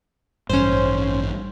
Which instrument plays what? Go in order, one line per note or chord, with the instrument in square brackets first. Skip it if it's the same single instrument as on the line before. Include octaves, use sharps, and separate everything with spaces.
[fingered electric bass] A1 G2 [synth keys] C#4 C5